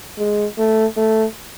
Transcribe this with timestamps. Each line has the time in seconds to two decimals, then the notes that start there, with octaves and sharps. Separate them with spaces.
0.18 G#3
0.58 A3
0.97 A3